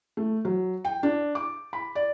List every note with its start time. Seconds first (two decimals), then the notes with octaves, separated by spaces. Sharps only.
0.17 A3
0.45 F#3
0.85 G5
1.03 D4
1.35 D6
1.73 B5
1.95 D5